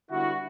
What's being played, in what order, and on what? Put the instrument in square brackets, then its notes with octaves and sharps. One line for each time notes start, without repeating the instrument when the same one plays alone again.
[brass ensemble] D3 G3 B3 E4 F#4